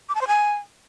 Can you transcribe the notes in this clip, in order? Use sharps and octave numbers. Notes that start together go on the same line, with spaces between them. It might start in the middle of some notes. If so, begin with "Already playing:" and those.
D6
A5
C5
G#5